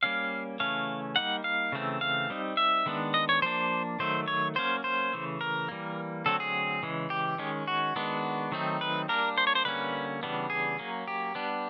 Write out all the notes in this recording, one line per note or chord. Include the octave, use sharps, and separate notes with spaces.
G3 A#3 C#4 F5
C#3 E3 A3 C#4 F5
G3 A#3 D#4 F#5
F5
C#3 E3 A3 C4
F5
G3 C4 D#4
E5
D#3 G#3 B3 D4
D#5
C#5
F3 A#3 D4 C5
D#3 F#3 A3 C5
C#5
F#3 A#3 C#4 C5
C5
C#3 E3 A3
A#4
E3 G3 A#3
D3 F#3 A3 C4 A4
G#4
C#3 E3 G#3
G4
D#3 G#3 C#4
F#4
D#3 G#3 B3 D4
D#3 F#3 A3 C4 D#4
B4
G3 A#3 D4 A#4
C5
C#5
C5
D3 G3 A#3 C#4 B4
C#3 E3 G3 B3 D4
G#4
F#3 A#3 C#4
G4
G3 B3 D4